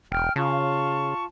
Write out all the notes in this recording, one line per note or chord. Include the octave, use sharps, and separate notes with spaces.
E1 G5 F6
C#3 F4 A5 C#6